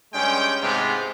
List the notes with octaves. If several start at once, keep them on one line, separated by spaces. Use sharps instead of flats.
G2 G#3 C#4 G5
G#2 C3 G#3 B3 F4